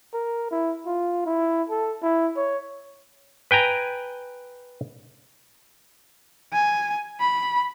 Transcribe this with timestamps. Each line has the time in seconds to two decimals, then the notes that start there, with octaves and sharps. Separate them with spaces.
0.14 A#4
0.51 E4
0.87 F4
1.26 E4
1.69 A4
2.03 E4
2.36 C#5
3.51 B4 G5 G#5 A#5
6.52 G#5
7.20 B5